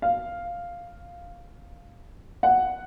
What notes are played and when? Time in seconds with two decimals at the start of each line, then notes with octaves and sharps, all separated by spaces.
0.02 F5
2.43 F#5